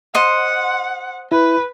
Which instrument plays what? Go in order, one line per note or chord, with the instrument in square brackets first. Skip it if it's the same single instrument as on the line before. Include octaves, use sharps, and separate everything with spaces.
[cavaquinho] C5 D#5 C6 [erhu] F#5
[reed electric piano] E4 [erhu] B4